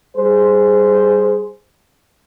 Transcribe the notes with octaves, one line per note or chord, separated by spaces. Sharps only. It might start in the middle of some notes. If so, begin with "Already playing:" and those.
G3 G#4 C5